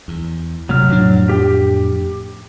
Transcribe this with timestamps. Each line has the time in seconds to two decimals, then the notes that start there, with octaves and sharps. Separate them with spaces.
0.08 E2
0.69 C3 F#3 A3 F6
0.88 F2 A2 D4
1.29 G4 G5